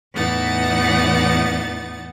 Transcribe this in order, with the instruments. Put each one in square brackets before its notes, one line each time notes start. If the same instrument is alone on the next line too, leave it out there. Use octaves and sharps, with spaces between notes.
[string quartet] E2 A2 E3 D#4 F#5 A6